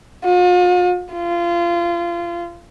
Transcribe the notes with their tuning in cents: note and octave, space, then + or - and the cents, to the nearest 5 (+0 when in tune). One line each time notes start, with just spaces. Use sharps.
F4 +45
F4 -25